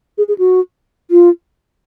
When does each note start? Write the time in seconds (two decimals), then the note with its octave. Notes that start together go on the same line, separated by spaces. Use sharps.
0.18 G#4
0.28 G#4
0.38 F#4
1.11 F4